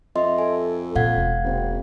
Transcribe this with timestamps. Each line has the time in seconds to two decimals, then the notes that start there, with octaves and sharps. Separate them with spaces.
0.16 F2 D#5 E5 C6
0.38 A4 G#5
0.96 A#2 F5 F#5 G#6
1.15 E1
1.44 F#1 C4